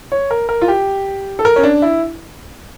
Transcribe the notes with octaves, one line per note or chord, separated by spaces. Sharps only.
C#5
A#4
A#4
F4
G4
A4
A#4
C#4
D4
E4